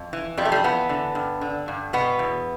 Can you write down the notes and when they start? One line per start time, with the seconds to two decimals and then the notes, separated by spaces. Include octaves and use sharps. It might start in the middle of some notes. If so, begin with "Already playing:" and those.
Already playing: F2
0.13 E3
0.37 F2 G3
0.45 A3
0.52 G3
0.64 E3 B3
0.89 D3
1.15 G2
1.41 D3
1.68 G2
1.93 B2 B3
2.19 E2